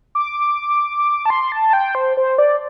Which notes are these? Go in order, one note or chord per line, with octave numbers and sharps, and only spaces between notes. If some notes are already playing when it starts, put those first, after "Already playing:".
D6
A5
C6
A5
G5
C5
C5
D5